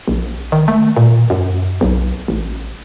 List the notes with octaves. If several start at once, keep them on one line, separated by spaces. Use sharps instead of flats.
A#1
D#3
A3
A#2
F#2
B1
A1